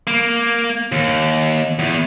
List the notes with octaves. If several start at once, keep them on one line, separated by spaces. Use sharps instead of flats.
A#3
D#2
E2